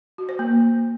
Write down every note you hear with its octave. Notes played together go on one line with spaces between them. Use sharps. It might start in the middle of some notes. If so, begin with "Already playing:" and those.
F#4
C5
A#3